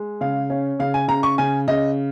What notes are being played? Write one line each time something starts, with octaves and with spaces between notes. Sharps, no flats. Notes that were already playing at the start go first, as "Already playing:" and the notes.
Already playing: G#3
C#3 F5
C#4
C#3 F5
G#5
C#3 A#5
C#6
C#3 G#5
C#3 D#5